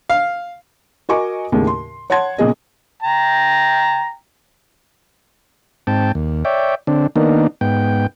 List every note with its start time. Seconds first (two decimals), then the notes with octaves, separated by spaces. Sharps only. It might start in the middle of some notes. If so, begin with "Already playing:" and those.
0.10 F5
1.09 F#4 A#4 D#5 G#5 C#6 D6
1.52 D#2 A2 C#3
1.67 C6
2.10 C#5 F#5 A5 C6 G#6
2.38 B1 A#2 C#3 G#4 D#5
3.03 G5 A#5
5.87 G#2 C4 G5 A5
6.15 D#2
6.45 C#5 D5 E5 G5
6.87 D3 C4 D4
7.16 D#3 A#3 B3 D4 D#4
7.61 G#2 B3 G5